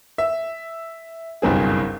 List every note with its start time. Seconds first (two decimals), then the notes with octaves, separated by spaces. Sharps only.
0.18 E5
1.42 F#1 B1 G2 C4 G#4